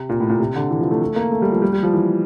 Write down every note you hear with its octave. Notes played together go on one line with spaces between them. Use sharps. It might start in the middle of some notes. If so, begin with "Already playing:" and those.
Already playing: C3
A#2
A2
A#2
C3
D3
E3
F3
A3
A3
A#3
A3
G3
F3
G3
G3
F3
E3